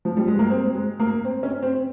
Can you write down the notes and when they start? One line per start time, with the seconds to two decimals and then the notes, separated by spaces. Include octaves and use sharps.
0.05 F3
0.17 G3
0.28 G#3
0.39 A#3
0.50 C4
0.75 G#3
1.00 A#3
1.25 C4
1.43 C#4
1.62 C4